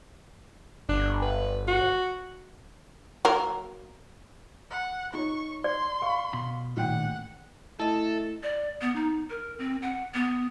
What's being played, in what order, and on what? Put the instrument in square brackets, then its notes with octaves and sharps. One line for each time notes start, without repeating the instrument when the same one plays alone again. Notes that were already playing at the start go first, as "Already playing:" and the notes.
[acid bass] G1 [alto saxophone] D4
[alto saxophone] B4
F#4
[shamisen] F#3 A#3 A#4
[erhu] F#5
[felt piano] D#4 C#5 [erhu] C#6
[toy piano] D5 [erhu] C6
[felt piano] F5 C#6
[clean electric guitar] B2 B5
[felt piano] A1 G5 [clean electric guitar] A#2 D#3 [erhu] F#5
[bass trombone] A3 [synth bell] E4 D#5 [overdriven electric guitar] A4
[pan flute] D5
B3
D#4
A#4
C4
F#5
B3